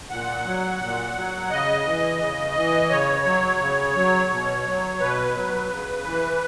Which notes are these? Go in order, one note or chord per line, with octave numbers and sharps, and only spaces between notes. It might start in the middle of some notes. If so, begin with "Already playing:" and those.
A#2 F#5
F#3
A#2
F#3
C#3 D#5
E3
C#3
E3
C#3 C#5
F#3
C#3
F#3
B2
F#3
B2 B4
F#3
C#3
E3